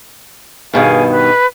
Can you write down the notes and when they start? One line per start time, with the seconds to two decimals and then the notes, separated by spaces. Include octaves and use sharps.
0.74 G2 B2 D#3 G#4 F5 G#5
1.09 B4